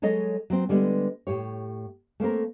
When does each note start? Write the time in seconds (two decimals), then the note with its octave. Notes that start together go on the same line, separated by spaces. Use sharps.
0.02 F#3 G#3 G#4 A4 C#5 D#5
0.50 F#3 C4
0.69 D3 G3 G#3 B3
1.27 A2 G4 C#5
2.20 A3 A#3 C4 A#4